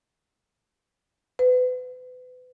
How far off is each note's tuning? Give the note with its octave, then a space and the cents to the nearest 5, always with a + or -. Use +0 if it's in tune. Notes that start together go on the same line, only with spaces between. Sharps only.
B4 +35